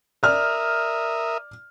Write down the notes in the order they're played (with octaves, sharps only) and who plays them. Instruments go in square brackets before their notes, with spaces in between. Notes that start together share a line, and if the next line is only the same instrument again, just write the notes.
[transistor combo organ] A#4 E5 D#6 [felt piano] D5 F6